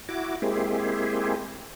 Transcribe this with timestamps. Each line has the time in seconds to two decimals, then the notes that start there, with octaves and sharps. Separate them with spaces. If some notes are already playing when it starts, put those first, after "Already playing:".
0.09 E4 F#4 D6
0.42 G#3 A#3 C4 E4 G4 G#4